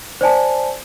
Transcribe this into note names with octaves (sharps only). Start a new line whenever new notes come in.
C5 D5 G#5 A5